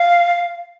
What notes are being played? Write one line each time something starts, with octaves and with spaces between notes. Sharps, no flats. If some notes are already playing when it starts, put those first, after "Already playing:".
Already playing: F5